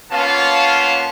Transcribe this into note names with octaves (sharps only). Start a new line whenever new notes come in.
A#3 B3 C#4 F4 F5 A5